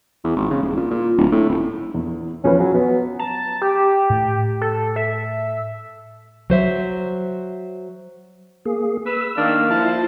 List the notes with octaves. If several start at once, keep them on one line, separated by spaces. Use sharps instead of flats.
E2
G#1
C#3
D#1
A#2
A#2
D1
A2
D#1
E2
E2 F3 C#4 B4
F#3 G#5
F#3 B3
A5 A#5
G4
A2
A4
E5
F#3 C5 E5
A#3 G#4
B4 E6
D#3 A#3 D4 F5
F3 E4 C5 A5